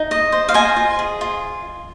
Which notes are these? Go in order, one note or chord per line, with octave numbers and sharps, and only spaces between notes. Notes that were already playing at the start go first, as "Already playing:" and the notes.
Already playing: D#4
D#5
C5
F5
C5 D#5 G#5
F4
G#4
F4